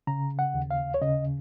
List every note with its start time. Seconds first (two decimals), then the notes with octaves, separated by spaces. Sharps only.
0.07 C#3 A#5
0.39 F#5
0.54 D#2
0.71 F5
0.94 C#5
1.02 C#3 D#5